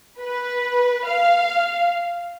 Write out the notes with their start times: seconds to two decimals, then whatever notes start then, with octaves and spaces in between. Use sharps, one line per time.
0.19 B4
1.05 F5